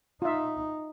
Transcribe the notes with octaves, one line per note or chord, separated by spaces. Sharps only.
D#4 F4 E5